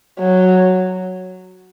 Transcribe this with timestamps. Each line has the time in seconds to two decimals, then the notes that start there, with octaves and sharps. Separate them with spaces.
0.19 F#3